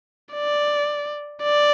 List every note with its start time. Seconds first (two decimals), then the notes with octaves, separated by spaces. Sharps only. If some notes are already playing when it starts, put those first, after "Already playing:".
0.33 D5
1.43 D5